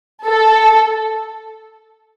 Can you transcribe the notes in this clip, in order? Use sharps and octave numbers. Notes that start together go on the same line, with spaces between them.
A4